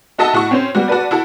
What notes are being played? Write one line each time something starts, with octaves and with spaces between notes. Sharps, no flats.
D#4 F#4 A4 D#5 E5 A5
A2 F#4 A4 C#6
C4 C#4 C5
G3 B3 F#4
F#4 A4 B4 D5
E4 F#4 A4